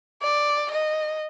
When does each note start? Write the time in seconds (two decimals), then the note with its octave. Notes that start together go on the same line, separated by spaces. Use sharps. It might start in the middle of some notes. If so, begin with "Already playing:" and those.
0.23 D5
0.71 D#5